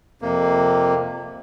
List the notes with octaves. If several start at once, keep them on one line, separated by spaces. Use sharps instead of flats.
F2 C3 A#3